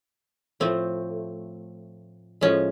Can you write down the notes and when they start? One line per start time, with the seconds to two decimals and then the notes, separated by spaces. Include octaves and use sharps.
0.60 A2 F3 A3 C4
2.41 A2 F3 G#3 C#4